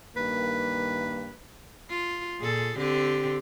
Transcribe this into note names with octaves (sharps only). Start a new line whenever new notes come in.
G2 D#3 A#3 B4
F4
A#2 G#4 A4
D3 C4 G4